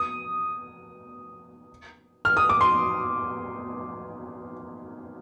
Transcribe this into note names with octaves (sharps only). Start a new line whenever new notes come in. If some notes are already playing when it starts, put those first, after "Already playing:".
Already playing: D#6
F6
D#6
D6
C6